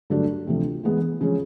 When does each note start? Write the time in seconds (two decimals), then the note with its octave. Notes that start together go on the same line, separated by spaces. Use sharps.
0.10 G2 D3 F#3 A3 D4
0.47 D2 C3 F3
0.83 E3 G#3 B3
1.21 C#3 F3 G#3 C#4